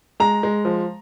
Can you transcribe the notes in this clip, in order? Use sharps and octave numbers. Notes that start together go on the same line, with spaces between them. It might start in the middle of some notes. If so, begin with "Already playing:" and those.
G#3 A#5
G#3
F3